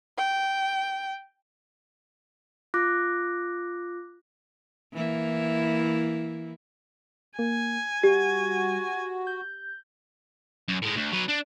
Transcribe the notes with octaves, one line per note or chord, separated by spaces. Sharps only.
G5
F4 D6 F#6 A#6
E3 A#3 E4
A#3 G#5
G3 F#4 G4
G6
F#2
A2 G#3
D2
F#3 B4
D4